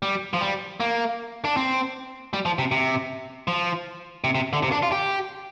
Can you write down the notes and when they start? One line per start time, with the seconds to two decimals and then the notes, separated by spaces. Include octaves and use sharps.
0.02 G3
0.33 F3
0.41 G3
0.80 A#3
1.45 D4
1.57 C4
2.33 G3
2.45 F3
2.59 C3
2.72 C3
3.48 F3
4.24 C3
4.35 C3
4.53 D3
4.63 C3
4.72 D4
4.83 F4
4.92 G4